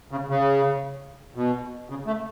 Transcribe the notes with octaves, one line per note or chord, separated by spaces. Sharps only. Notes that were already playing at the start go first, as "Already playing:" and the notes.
C#3
C#3
B2
C#3
A3